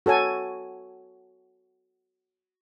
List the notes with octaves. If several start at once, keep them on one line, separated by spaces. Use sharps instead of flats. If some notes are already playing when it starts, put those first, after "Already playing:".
F#4 A4 C#5 G#5